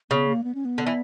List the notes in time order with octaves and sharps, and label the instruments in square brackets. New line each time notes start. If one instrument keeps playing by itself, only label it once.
[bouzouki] C#3 [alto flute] B3
[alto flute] A#3
B3
C#4
B3
[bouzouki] D3
E3